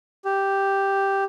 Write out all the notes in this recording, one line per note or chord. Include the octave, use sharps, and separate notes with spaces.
G4